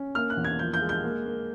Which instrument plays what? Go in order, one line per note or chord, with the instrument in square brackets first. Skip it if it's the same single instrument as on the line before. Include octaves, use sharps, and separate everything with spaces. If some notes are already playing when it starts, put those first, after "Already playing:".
Already playing: [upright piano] C#4
A#3 F6
F#6
E2
G#6
F3 G6
G6
G#3
G6
A#3
A#3